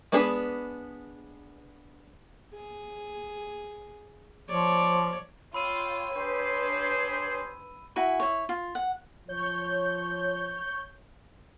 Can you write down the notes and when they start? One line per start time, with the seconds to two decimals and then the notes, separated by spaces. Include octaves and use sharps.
0.12 G#3 B3 D4 G#4 B4
2.54 G#4
4.49 F3 C#5 D5
5.54 F4 C#5 G5 B5 E6 D#7
6.16 D4 G4 G#4 B4 C5
7.96 E4 F#4 G#5 B5
8.20 E4 C#5
8.49 F4
8.75 F#5
9.28 F3 C#5 G6